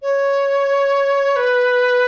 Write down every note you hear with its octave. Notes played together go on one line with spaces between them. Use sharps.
C#5
B4